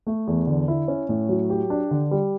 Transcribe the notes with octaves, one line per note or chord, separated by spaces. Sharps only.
A3
E2
D3
E4
C#4
A2
F#3
G4
D4
D3
G3